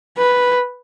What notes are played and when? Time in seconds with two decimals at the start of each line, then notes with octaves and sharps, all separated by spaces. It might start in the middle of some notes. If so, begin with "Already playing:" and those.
0.18 B4